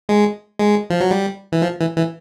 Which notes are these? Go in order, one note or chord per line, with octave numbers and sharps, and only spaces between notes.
G#3
G#3
F3
F#3
G3
E3
F3
E3
E3